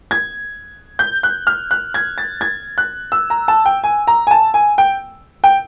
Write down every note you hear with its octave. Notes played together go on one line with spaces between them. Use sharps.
G#6
G6
F#6
F6
F#6
G#6
A6
G#6
F#6
E6
A#5
A5
G5
G#5
A#5
G#5
A5
G#5
G5
G5